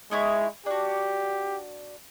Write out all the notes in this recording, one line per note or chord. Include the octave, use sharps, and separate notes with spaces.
G#3 D#4 E4 C#5
D4 F#4 G4